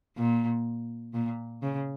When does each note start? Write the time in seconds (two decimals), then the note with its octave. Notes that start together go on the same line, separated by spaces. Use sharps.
0.17 A#2
1.14 A#2
1.63 C#3